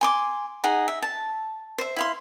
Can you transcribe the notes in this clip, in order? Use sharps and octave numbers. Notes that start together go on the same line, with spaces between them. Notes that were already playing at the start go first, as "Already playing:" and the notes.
G#5 C6 D6
D#4 G#4 F#5
E5
A5
C5 E5
E4 F5 C6